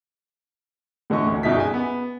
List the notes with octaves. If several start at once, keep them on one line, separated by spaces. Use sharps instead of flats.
A2 D3 E3 D#5 C#6
D2
G1 B2 D#4 E5 B6
G#4 G#5
B3